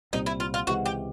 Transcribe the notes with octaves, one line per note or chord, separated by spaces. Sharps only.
C2 A#2 G3 C4 D#4
E4
F4
F4
C#2 C3 E3 G#3 F#4
G4